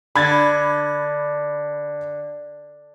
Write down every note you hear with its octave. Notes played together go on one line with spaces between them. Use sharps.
D3 B5 G#6 A6